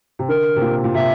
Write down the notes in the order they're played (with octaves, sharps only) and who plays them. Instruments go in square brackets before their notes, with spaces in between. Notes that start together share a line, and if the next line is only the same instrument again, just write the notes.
[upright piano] C3
[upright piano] D3 [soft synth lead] A#4
[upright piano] C3
A#2
A#2
[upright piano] C3 [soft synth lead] E5